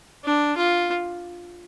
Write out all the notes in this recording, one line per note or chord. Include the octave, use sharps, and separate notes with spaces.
D4
F4